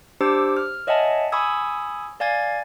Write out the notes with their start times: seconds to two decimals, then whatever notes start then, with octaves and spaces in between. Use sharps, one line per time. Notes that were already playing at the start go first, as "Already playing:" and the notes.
0.21 D4 G4 C5 D6 E6
0.57 F6
0.87 C#5 D#5 E5 F#5 G#5 A5
1.32 G#5 B5 C#6 D#6 E6 G#6
2.20 D5 F5 G#5 G#6 A6